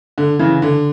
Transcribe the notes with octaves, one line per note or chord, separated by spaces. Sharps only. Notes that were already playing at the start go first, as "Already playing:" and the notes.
D3
C#3 E3
D3